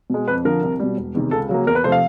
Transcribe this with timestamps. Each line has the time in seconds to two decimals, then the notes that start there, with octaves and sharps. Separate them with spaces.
0.10 B2 G#3
0.28 F2 B4
0.45 D3 F3 A#4
0.62 C2
0.80 B2 G3
0.97 E1
1.14 E2 C3 D#3
1.31 C#2 A4
1.49 C#3 F#3 A#3
1.66 E2 A#4
1.75 B4
1.84 C3 F3 A3 C5
1.92 F5